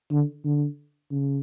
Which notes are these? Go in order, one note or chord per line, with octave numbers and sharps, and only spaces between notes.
D3
D3
C#3